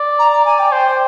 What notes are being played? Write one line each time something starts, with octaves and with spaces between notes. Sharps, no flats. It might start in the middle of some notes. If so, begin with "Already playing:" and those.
Already playing: D5
A#5
A#5
G#5
G5
C5 G5